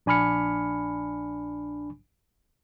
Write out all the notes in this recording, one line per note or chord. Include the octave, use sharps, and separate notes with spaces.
A#1 D4 G#5 B5 F6 C#7